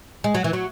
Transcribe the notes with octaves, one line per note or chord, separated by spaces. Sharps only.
G#3
F#3
E3
F#3